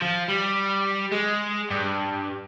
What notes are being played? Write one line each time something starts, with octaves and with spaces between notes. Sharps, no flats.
F3
G3
G#3
G2